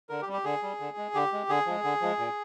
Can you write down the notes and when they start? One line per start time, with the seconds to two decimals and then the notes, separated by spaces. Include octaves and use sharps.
0.09 D3 A#4
0.22 G4
0.27 G3
0.33 G4
0.44 D3 G#4
0.63 G3
0.80 D3
0.97 G#3
1.14 D3 G4
1.33 G#3
1.49 D3 G#4
1.66 F3 G#3
1.84 D3
2.02 F3 G#3
2.19 A#2